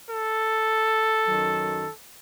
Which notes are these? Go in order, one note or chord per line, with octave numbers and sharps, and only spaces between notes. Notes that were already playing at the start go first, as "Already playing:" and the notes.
A4
F#2 D#3 F#3